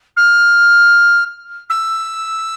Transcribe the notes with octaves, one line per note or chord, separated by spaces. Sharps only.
F6
E6